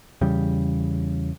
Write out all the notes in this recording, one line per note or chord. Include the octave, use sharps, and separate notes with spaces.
E2 C#3 G3